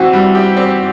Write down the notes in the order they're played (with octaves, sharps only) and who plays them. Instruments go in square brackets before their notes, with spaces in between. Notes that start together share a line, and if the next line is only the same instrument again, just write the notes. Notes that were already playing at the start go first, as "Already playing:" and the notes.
Already playing: [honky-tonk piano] E3 C4 [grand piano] F#4
[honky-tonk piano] G3
G4
C4